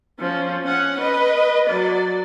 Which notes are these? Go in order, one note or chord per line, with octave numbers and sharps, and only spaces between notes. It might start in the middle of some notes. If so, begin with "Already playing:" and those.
F3 C#4
C#4 F#5
B4 D#5
F#3 D5